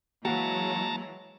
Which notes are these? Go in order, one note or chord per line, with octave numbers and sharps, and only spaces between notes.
E3 F#3 G#3 A#3 F#4 F#5 A5 A#5